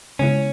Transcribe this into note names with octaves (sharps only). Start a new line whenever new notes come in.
C#3 G#3 B3 C#4 E4